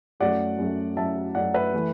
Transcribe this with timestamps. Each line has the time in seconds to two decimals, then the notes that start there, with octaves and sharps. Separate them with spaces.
0.20 F#2 F#3 A3 D5 F#5
0.58 F#2 F#3 A3
0.97 F#2 F#3 A3 E5 A5
1.35 F#2 F#3 A3 D5 F#5
1.54 B4 E5
1.73 E3 A3